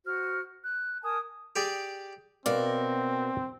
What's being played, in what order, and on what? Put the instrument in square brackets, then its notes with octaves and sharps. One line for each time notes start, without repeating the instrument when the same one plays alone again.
[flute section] F#4 C5 F6
F#6
A#4 G#5 A5 D#6
[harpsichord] G4 G#4 D5
[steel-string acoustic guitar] B2 F#4 A#4 [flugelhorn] C4 [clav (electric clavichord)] D5 F5